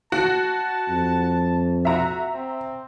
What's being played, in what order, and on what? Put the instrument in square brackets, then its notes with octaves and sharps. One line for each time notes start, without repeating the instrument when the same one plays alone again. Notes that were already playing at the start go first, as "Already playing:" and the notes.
[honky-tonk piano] F#4 [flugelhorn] A5
[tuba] F2
[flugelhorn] F#4 [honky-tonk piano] E5 A#5
[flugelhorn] C4